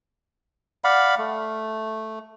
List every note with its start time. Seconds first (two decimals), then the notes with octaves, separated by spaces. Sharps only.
0.84 D5 F5 F#5 B5
1.18 A3